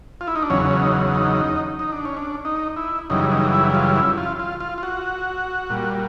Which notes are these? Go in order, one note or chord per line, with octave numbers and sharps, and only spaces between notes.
F4
E4
D#4
D4
E2 C#3 F#3 C#4
C#4
D#4
D#4
D#4
D4
C#4
D4
D#4
E4
F#2 C#3 E3 G3 D#4
D#4
E4
F4
E4
F4
F4
F4
F4
F#4
A#2 G3